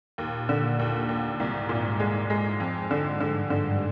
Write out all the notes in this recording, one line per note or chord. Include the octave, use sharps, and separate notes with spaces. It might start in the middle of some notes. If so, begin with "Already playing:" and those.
D#2 A#2
D3
D#2
D#2
C2 G#2
A#2
G#3
G#3
F2
D3
G2 D3
D3